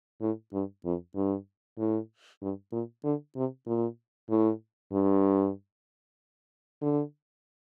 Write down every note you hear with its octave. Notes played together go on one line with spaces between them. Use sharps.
A2
G2
F2
G2
A2
G2
A#2
D3
C3
A#2
A2
G2
D3